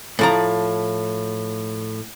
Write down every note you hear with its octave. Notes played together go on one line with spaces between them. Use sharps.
A2 F3 A#5